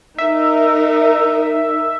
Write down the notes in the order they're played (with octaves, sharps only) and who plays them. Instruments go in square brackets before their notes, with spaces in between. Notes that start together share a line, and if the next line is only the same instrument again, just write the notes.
[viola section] D#4 A#4 [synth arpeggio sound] E5